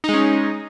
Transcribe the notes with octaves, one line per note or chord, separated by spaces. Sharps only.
G#3 C#4 D#4